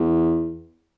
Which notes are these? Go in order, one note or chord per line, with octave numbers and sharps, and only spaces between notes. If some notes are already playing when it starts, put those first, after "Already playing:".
Already playing: E2